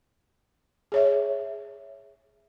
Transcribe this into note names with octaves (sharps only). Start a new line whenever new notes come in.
G#4 C#5 E5